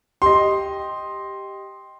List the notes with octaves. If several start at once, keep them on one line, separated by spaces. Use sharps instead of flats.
G4 D#5 C6